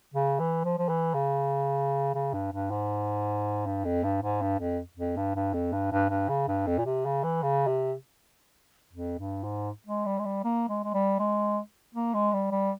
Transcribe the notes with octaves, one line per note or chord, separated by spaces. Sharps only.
C#3
E3
F3
F3
E3
C#3
C#3
G2
G2
G#2
G2
F2
G2
G#2
G2
F2
F2
G2
G2
F2
G2
G2
G2
C#3
G2
F2
A#2
C3
C#3
E3
C#3
C3
F2
G2
G#2
G#3
G3
G#3
G3
A#3
G#3
G#3
G3
G#3
A#3
G#3
G3
G3